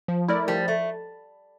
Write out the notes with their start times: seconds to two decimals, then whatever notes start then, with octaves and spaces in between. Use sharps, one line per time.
0.08 F3
0.28 A3 E4 A#4 D5
0.48 F3 G3
0.68 A3